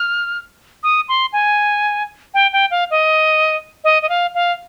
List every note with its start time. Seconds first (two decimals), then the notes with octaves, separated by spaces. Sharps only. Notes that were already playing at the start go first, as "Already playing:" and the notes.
Already playing: F6
0.83 D#6
1.09 C6
1.33 G#5
2.34 G5
2.53 G5
2.71 F5
2.91 D#5
3.84 D#5
4.02 D#5
4.09 F5
4.35 F5